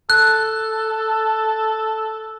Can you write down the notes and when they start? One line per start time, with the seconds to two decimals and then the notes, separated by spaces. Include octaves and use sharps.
0.10 A4 F#6